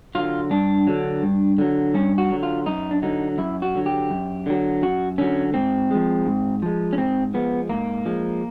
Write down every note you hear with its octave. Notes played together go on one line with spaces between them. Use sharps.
D3 F#3 F4
G2 D4
D3 F#3
G2
D3 F#3
G2 C#4
F#4
D3 F#3
F4
F#2 D#4
D4
D3 F#3 D#4
F#2 E4
F#4
D3 F#3
G4
F#2
D3 F#3
F#2 F#4
D3 F#3 C#4
G#2 C4
F3 G#3
G#2
F3 G#3
C#4
G#2 C4
F3 G#3 B3
G#2 A#3
F3 G#3